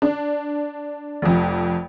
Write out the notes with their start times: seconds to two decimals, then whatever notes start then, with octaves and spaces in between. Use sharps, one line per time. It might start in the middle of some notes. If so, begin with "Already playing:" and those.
0.02 D4
1.22 F1 F2